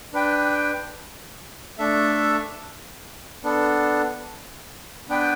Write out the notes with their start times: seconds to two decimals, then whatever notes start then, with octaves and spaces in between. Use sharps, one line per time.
0.13 D4 B4 G5
1.78 A3 D4 A4 E5
3.44 B3 D4 A4
5.09 B3 D4 B4 G5